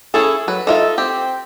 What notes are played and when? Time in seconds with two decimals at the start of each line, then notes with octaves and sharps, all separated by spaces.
0.14 C#4 E4 G#4 A4
0.48 F#3 B4
0.67 D#4 F4 A4 E5
0.98 C4 G4